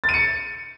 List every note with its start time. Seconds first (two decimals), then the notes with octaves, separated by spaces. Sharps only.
0.04 A6
0.09 D#7
0.14 C#7